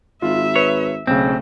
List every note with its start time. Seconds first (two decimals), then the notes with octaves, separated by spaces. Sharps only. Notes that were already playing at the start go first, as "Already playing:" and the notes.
0.22 G#1 F4 E5
0.56 B4 C#5
1.07 B1 C#3 A3 C4